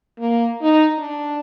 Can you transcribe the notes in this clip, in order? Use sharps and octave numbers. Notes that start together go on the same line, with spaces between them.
A#3
D#4
D4